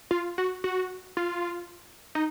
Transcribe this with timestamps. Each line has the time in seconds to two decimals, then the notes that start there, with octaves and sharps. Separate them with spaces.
0.11 F4
0.38 F#4
0.64 F#4
1.17 F4
2.15 D#4